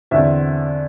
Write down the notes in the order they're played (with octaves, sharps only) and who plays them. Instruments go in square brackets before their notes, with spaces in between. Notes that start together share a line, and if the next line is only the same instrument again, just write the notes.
[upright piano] E2 D3 C4 E5